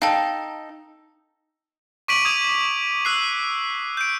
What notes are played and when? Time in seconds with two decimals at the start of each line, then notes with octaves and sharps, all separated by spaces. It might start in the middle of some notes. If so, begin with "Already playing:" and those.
0.02 D#4 A4 F5 G5
2.08 C#6 D6 B6 D7 D#7 F#7
2.25 D#6 G#6
3.05 E6 F#6 C7
3.97 G6 D7